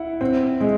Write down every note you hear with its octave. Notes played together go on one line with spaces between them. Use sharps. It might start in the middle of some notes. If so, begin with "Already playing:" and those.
Already playing: E4 F#5
C4
G#3